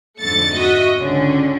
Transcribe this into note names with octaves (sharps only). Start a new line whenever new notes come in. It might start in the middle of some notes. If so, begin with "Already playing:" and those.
F2 G#2 D3 A3 A6 C#7
F#4 D#5 E5
C#2 D3 C#4